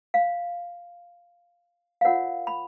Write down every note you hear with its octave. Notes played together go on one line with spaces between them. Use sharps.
F5
F5
F4 A#4 C#5 F#5
B5